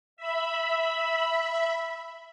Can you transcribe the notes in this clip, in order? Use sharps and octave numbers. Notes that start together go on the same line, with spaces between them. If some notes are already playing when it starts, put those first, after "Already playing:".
E5 B5